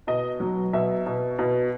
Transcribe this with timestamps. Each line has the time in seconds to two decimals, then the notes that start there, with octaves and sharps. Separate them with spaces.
0.07 B2 D#5
0.40 F#3
0.73 B2 E5
1.06 B2
1.39 B2